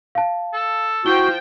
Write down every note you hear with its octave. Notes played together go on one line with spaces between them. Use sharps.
F5 A5
A4
F3 E4 F#4 G5 G7